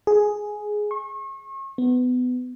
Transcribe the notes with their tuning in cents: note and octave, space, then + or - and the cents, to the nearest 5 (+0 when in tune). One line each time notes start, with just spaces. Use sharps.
G#4 +5
C#6 -40
B3 +20